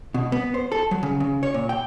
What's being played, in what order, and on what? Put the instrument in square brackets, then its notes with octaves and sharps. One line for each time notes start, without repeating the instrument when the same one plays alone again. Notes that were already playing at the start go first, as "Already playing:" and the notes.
[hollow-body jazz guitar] B2
B3
C5
A4
F#3
C#3
C#3
C#5
A#2
G5